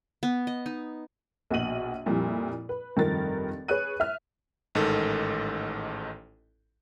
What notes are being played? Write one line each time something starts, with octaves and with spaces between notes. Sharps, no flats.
B3
D#5
D#4
A#1 B2 F#4 D#5 D#7 F#7
F2 A#2 G3 E4
B4
F1 G2 D#3 F3 A#4 A6
G#4 B4 C#5 F#6 D#7
E5 F6
A1 G#2 D#3 A4